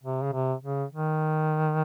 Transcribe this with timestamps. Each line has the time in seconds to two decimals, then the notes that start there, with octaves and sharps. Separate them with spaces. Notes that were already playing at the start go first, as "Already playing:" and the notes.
0.04 C3
0.23 C#3
0.33 C3
0.63 C#3
0.93 D#3